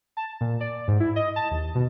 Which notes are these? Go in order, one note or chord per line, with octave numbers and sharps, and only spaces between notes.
A5
A#2
D5
G#2
E4
D#5
A5
D#2
B2